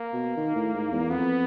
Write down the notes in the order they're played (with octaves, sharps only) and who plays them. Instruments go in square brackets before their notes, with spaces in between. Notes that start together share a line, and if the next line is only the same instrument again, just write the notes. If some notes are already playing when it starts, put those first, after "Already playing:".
Already playing: [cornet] A#3
[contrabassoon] B2
D#3
A2
G#2
E2
[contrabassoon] F2 [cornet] B3